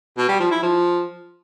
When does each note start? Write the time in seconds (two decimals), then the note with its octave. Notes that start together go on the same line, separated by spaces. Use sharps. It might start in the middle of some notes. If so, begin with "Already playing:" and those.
0.17 B2
0.29 G3
0.40 F3
0.51 E4
0.62 F3